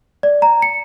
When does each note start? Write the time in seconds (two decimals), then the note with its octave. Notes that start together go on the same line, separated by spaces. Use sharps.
0.23 D5
0.42 A#5
0.62 C#7